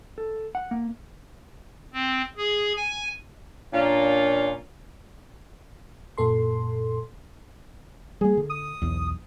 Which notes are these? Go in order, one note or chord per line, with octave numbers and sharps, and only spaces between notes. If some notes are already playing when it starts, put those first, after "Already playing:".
A4
F#5
A#3
C4
G#4
G#5
A#2 A#3 C#4 D4 F4
F#2 A#2 A4 C6
G3 A#3 G#4
D3
D#6
B1 E2